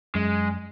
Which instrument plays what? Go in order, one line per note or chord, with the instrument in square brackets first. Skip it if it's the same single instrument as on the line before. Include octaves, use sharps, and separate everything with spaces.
[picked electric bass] F#2 [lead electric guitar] G#3